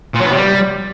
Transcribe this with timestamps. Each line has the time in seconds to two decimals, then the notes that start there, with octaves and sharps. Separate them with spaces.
0.14 A#2
0.20 F#3
0.25 B3
0.31 C3
0.36 G3